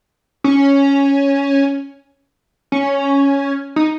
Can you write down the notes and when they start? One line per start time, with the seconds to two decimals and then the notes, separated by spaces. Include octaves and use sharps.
0.44 C#4
2.72 C#4
3.76 D#4